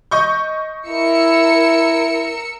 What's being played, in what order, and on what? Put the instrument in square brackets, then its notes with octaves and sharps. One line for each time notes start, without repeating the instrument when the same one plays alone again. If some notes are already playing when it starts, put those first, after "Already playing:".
[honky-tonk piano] D#5 C#6 G6
[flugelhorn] E4 [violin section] A#4 E6 C#7